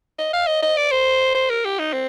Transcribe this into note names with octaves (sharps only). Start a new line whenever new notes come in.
D#5
F5
D#5
D#5
D5
C5
C5
A#4
G4
D#4
C4